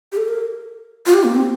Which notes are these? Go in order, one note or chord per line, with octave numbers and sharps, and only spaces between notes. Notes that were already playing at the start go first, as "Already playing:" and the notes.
G4
A4
A#4
F4
G4
A#3
C4